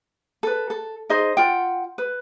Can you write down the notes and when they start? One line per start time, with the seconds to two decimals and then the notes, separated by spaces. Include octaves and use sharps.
0.43 A4 B4
0.70 A4
1.09 D#4 G#4 C5 D#5
1.37 F4 F#5 G5
1.98 B4